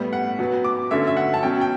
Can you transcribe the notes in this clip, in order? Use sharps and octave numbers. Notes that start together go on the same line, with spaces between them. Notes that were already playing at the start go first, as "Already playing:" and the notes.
Already playing: A2 G3 B3
F#5
B2 F#3 B3
D6
D3 F#3 A3 C#4 E5
E5
F#5
A5
B2 F#3 C#4 G5
G5